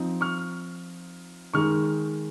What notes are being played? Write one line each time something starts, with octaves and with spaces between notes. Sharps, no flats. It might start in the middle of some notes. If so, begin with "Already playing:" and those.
Already playing: F3 C4 D#4
C#6 F6
D#3 G#3 D#4 C#6 F6